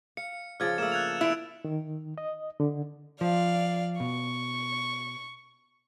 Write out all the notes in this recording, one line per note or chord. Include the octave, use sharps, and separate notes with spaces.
F5 C#7
C#3 F3 D4 F6 G#6 A6
A3 A#3 E6 F6 E7
F#6 G#6 F7
E4 E6 D7 F7
D#3
D#5
D3
F3 D5 F5
B2 C#6